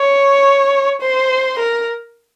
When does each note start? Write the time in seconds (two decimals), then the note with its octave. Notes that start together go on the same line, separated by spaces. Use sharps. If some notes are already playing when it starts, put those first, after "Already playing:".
Already playing: C#5
1.01 C5
1.59 A#4